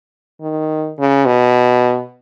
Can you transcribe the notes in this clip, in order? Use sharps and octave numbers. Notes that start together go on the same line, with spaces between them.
D#3
C#3
B2